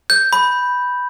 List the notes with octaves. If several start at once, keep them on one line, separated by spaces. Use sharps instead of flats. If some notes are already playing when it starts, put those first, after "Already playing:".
G6
B5